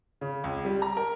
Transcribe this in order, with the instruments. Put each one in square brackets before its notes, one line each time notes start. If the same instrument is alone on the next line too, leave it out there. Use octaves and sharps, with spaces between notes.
[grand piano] C#3
C#2
G3
A#5
A#4